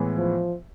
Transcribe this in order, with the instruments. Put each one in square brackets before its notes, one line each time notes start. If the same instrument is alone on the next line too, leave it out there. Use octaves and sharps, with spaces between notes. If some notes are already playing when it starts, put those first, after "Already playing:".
Already playing: [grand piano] A2 E3 G#3 B3 E4
[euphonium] F3